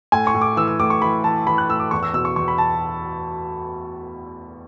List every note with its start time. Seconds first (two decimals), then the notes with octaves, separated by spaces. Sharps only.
0.12 A2 G#5
0.27 C#6
0.34 A2
0.42 D6
0.57 E3 E6
0.68 E6
0.79 A2 D6
0.90 C#6
1.02 E3 B5
1.24 E3 A5
1.47 E3 B5
1.58 F#6
1.70 A2 E6
1.80 D6
1.91 E2 C#6
2.03 E6
2.14 B2 E6
2.25 C#6
2.36 E2 C#6
2.48 B5
2.58 A5